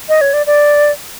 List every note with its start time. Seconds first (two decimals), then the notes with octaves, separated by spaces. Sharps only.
0.09 D#5
0.21 C#5
0.33 D5
0.47 D5